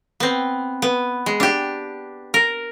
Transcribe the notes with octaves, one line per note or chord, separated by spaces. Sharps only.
B3 C4
B3
G#3
D4 G4
A#4